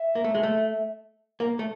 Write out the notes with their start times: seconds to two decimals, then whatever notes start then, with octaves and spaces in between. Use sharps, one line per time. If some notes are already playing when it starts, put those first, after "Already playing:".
Already playing: E5
0.15 A#3
0.24 A3
0.35 G#3
0.43 A3
1.40 A#3
1.59 A3